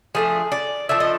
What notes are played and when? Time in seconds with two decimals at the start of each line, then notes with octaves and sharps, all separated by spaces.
0.15 F3 A3 D4 G#4
0.52 D5
0.89 F3 A3 D4 E5
1.00 D#5